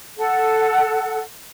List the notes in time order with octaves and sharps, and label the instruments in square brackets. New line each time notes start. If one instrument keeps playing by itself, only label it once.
[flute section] A4 F#5